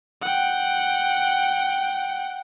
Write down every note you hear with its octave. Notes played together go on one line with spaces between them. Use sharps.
F#5 G5